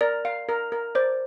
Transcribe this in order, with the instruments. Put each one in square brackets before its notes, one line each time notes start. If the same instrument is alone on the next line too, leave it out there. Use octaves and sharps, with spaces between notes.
[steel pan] A#4 [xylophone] D5
[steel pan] F5
A#4
A#4
[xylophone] C5 [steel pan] D5